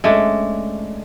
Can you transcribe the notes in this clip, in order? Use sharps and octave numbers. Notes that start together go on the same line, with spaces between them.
G#3 A3 C#4 D4